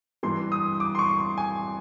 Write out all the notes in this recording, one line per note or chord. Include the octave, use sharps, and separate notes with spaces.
G2 E3 C6
D#6
D6
C6
C#6
C6
G#5